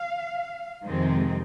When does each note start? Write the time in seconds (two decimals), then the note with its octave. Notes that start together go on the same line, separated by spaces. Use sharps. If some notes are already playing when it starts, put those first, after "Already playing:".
Already playing: F5
0.85 F2 C3 D#3 G#3 C4